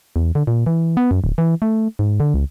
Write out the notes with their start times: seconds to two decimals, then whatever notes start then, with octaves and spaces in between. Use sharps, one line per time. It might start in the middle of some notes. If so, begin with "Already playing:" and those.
0.16 E2
0.35 D3
0.47 A#2
0.66 E3
0.97 B3
1.11 F#2
1.24 D1
1.38 E3
1.62 A3
1.99 G#2
2.20 D3
2.34 C#2